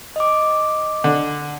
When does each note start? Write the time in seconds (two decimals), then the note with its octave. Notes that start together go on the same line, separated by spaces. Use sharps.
0.16 D#5 D6
1.04 D3